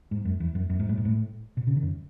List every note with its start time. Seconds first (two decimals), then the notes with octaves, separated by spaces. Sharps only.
0.11 G#2
0.25 F#2
0.40 E2
0.55 F#2
0.70 F#2
0.79 G#2
0.89 A2
0.97 G#2
1.05 A2
1.57 B2
1.67 C#3
1.76 D#3
1.83 F#2